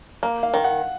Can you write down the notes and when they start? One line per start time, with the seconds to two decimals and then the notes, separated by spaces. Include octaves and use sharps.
0.23 A#3
0.43 F5
0.54 D#3
0.64 F#5